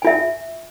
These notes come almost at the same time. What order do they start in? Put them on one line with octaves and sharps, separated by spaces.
G#5 F4 E5